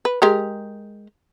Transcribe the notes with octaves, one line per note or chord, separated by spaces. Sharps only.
B4
G#3 G4 A#4